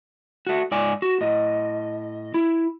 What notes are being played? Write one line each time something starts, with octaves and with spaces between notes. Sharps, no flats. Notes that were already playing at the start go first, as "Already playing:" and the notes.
A3 F#4
G#2 D5 G#5
F#4
A2 D#5
E4